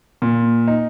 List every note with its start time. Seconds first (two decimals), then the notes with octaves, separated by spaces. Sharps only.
0.22 A#2
0.68 D#4